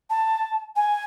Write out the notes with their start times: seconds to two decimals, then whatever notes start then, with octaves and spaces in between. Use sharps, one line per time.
0.10 A5
0.76 G#5